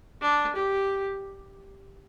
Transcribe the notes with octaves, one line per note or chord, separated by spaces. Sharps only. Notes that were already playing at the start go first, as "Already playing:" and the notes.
D4
G4